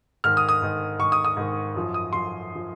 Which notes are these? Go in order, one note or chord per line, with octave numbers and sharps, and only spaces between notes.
G#2 D#3 F6
D#6
D#6
G#2 D#3
G#2 D#3 C#6
D#6
D#6
G#2 D#3
F#2 F3
D#6
F#2 F3 C6
F3